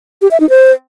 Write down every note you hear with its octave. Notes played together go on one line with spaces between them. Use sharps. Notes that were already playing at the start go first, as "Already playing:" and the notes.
G4
E5
D#4
C5